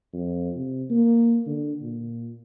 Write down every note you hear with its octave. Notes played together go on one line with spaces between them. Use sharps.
F2
C3
A#3
D3
A#2